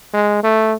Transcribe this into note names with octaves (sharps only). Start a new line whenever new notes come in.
G#3
A3